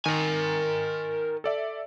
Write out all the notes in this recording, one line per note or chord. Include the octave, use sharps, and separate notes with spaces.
D#3 A#4 G#5
A4 D5 E5